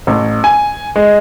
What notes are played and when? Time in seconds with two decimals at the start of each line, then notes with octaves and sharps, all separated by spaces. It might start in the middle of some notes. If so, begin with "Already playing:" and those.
0.07 A1
0.44 G#5
0.96 G#3